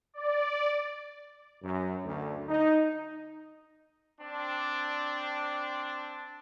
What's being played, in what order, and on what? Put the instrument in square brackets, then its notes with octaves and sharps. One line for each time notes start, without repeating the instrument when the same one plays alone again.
[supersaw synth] D5
[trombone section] F#2
D2
D#4
[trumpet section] C4 D4